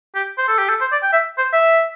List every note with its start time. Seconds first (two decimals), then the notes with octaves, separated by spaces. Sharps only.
0.15 G4
0.38 C5
0.48 A4
0.58 G4
0.69 A4
0.81 C5
0.92 D5
1.03 G5
1.13 E5
1.38 C5
1.53 E5